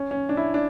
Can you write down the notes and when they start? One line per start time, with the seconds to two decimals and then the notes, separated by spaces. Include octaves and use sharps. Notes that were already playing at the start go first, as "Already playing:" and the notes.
Already playing: C#4
0.11 C#4
0.29 D4
0.37 E4
0.54 D4